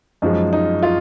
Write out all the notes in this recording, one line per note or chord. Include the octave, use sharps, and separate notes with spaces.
F#2 F3 G#3 D#4
D#4
F4